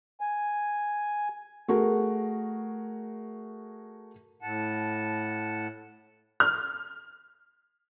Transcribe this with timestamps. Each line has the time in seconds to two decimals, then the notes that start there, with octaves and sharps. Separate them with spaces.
0.21 G#5
1.68 A3 F#4 G#4 A#4
4.42 A2 F#5 A5
6.40 F6